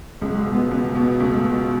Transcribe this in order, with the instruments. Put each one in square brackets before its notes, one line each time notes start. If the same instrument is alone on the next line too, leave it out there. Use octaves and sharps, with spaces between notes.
[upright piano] C#2 [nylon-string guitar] G#3
[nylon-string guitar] F#3
G#3
[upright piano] B2
[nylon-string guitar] B3
[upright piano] C#2 [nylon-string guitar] B3
[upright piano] B2 [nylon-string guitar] B3
[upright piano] C#2 [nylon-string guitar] A3
[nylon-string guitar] A3
[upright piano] B2